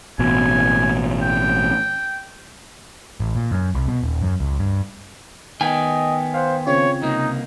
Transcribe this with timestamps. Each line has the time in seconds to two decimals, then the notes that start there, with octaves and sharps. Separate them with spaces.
0.19 A1 B2 G#5
1.23 G5
3.20 A1
3.36 A#2
3.52 F#2
3.75 C2
3.87 B2
4.04 D#1
4.23 F#2
4.40 C#2
4.59 G2
5.61 D#3 B3 D#5 G5 G#5
6.34 C5 F5 F#5
6.67 C#3 C4 F4 C#5
7.02 C2 A#3 D#4